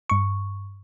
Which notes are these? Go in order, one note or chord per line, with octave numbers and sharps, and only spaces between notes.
G2 C#6